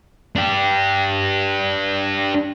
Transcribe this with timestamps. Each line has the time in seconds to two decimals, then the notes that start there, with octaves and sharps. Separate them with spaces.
0.36 D4 G4